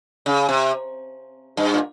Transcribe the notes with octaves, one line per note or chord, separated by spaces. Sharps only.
C#3
C3
G2
A#2